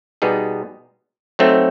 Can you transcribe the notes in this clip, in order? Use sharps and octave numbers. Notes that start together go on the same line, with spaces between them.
B2 G3 B3 D#4 G#4
F#3 A3 C4 D#4